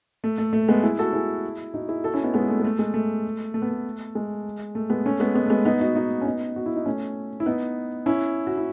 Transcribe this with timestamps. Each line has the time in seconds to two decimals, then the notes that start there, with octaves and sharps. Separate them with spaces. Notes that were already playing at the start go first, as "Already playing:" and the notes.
0.24 A3
0.38 A3
0.53 A3
0.68 G#3 B3
0.83 E4 G#4
0.99 F#4 A4
1.13 E4 G#4
1.74 D#4 F#4
1.89 E4 G#4
2.04 F#4 A4
2.13 C#4 E4
2.23 B3 D#4
2.34 G#3 B3
2.50 A3
2.60 G#3
2.64 A3
2.79 G#3
2.94 A3
3.54 A3
3.62 B3
3.69 A3
4.15 G#3
4.75 A3
4.90 G#3 B3
5.06 A3 C#4
5.20 G#3 B3
5.35 G#3 B3
5.46 A3
5.50 G#3 B3
5.65 B3 D#4
5.80 D#4 F#4
5.95 D#4 F#4
6.21 C#4
6.25 B3 D#4
6.56 F#4
6.66 E4
6.76 D#4
6.85 A3 C#4
7.40 E4
7.46 B3 D#4
8.06 C#4 E4
8.47 F#4
8.57 E4